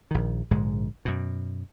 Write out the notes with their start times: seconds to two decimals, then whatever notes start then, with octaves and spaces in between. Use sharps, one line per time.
0.11 A#1 D#3
0.51 A#1 G#2 D3 G#3
1.05 F#2 B2